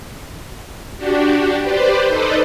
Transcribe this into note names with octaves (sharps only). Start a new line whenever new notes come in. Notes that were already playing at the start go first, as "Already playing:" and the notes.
D4 F#4 G4
G4 B4 C5 D5
D#4 A4 B4 C5 D5 D#5